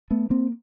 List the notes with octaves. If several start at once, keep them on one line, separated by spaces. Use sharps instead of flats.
A3 B3
A#3 C4